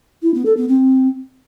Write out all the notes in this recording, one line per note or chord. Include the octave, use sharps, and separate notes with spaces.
E4
B3
A4
B3
C4